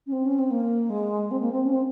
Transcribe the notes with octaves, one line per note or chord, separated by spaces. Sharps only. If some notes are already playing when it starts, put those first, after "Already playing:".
C#4
C4
C#4
C4
A#3
G#3
C4
A#3
C4
C#4
C4